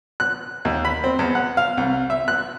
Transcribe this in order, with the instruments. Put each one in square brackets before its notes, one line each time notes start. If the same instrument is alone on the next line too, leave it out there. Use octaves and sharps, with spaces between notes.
[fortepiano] F#6
D#2
B5
C4
E2
F#5
F5
C2
E5
F#6